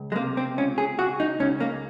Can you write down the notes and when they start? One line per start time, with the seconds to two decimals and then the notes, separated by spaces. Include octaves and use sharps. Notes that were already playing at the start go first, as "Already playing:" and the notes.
Already playing: C#2
0.12 G#3
0.16 C3 A#3
0.37 C4
0.57 C#2 C#4
0.78 G#4
0.99 C#2 F#4
1.20 D#4
1.39 C#2 C#4
1.60 A#3